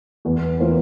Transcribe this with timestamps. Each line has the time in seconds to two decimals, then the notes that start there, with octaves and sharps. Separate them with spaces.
0.25 E2
0.60 E3 A#3 F4 C5